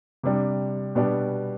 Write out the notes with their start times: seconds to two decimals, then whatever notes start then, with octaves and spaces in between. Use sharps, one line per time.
0.23 C3 G3 D4
0.95 B2 G3 B3 D4 G4